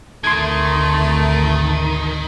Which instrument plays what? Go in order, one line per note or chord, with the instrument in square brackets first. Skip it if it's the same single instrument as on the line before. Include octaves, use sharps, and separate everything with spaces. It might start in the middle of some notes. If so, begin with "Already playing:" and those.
[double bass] G#1 D2 [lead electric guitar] D#3 [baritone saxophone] A3 [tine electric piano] C6 G#6